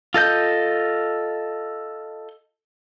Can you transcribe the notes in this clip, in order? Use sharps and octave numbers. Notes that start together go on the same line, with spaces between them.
F4 A4 D#5 G6